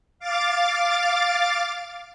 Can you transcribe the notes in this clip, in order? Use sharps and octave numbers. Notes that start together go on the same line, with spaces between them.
F5 D6 A6